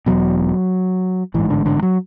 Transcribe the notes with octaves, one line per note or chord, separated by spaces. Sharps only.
E1 E2 B2 F#3
A1 G#2 E3
D3
D3
F#3